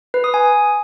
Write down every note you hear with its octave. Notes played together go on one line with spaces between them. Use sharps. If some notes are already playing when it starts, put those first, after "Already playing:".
B4
D#6
G#5